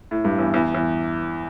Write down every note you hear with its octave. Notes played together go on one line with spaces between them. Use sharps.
A2
G2
E2
E2
E2